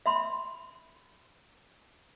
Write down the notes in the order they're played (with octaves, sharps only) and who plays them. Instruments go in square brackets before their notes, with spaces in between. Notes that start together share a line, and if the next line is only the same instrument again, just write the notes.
[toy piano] E5 B5 C6